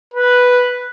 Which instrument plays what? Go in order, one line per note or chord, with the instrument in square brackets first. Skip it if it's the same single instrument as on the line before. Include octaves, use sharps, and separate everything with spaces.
[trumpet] B4